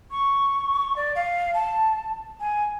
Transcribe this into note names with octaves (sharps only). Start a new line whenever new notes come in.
C#6
D5
F5
A5
G#5